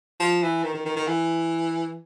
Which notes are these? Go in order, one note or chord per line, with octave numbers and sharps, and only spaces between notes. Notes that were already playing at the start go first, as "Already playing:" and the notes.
F3
E3
D#3
D#3
D#3
D#3
E3